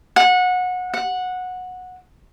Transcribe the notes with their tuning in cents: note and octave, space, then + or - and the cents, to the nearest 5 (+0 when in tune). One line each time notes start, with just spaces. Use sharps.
F#5 -25
F#5 -15